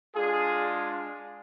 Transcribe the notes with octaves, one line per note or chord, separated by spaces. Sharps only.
G#3 D4 F4 G#4